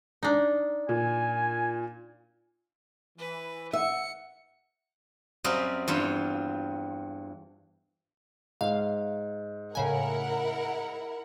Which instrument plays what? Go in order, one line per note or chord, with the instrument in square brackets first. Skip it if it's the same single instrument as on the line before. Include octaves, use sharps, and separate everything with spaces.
[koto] D4 D#4
[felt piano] A#2 [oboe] G#5
[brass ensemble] E3 [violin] B4
[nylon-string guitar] E5 [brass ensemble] F#5 [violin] C#7
[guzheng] F#2 G3 C4 F#4 D#5 F5
E2 G2 F4
[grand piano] G#2 [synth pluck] F5
[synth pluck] A2 C#3 G#5 [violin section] E4 A#4 F#5